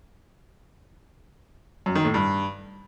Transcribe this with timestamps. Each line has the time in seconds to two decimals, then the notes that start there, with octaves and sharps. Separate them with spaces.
1.86 F#2
1.95 D#3
2.05 A2
2.14 G2